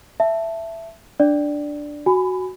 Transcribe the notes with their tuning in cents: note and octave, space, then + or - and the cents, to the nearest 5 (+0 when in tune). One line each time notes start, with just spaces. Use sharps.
E5 +10 A5 +0
D4 +0 D5 +0
F#4 +0 G#5 +0 B5 +15